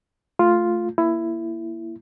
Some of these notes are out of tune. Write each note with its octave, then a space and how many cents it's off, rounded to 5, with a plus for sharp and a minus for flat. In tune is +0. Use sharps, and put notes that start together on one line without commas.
A3 +0 F4 +0
A#3 +0 E4 +15